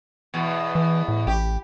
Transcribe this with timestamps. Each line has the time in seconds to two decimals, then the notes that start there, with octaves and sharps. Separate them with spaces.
0.34 E2 B2
0.75 E3
1.08 A2
1.27 A1 G4